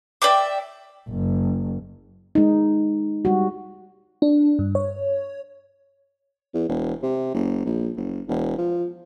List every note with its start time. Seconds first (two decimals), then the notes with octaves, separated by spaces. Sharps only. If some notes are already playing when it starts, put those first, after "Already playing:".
0.22 D5 E5 G5 D6
1.09 F#1
2.35 G#3 D#4
3.25 G3 F#4
4.22 D4
4.59 G2
4.75 C#5
6.54 E2
6.69 E1
7.03 C3
7.34 F#1
7.65 A#1
7.96 F#1
8.28 E1
8.58 F3